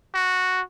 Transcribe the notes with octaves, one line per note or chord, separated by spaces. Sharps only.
F#4